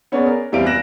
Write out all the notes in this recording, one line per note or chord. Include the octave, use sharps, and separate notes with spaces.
B3 C#4 G#4 D5
A#4
E2 G3 C4 E4 F5 D7
G3 F#6 A#6 E7